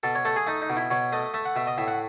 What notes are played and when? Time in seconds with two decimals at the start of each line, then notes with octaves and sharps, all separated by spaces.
0.03 B2 A4
0.15 C#5
0.25 A3 A4
0.36 G#4
0.47 A3 D#4
0.62 D#4
0.70 B2
0.77 E4
0.91 B2 C#5
1.12 A3 D#5
1.34 A3 E5
1.45 F#5
1.56 B2 E5
1.67 D#5
1.78 A2 E5
1.88 F#5